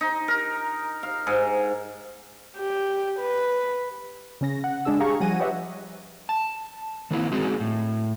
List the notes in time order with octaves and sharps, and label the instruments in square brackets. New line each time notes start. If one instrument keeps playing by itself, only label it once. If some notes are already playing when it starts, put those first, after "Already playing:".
[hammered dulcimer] D#4
A#4
F5
G#2
[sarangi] G4
B4
[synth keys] C#3 C#4 A#6
F#5
G#3 D4 G#4 E6
G4 G#4 F5 A#5 C#6
F3 G3 F#5 G#5 A#6 D#7
G4 B4 C#5 D#5 E5 F#5
[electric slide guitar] A5
D#3 A#3 C4 E4
G#3 C4 D#4 F#4 G#4
A2